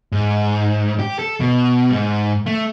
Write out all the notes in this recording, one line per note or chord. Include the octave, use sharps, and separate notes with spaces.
G#2
G4
A4
B2
G#2
A3